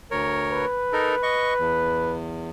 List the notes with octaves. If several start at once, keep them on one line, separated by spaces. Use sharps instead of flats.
D2 A#4 C#5
B4
D#4 A4 A#4
D#5 C#6
E2